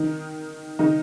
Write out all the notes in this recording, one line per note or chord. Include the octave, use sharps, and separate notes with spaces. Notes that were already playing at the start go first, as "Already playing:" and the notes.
Already playing: D#3 D#4
D#3 D#4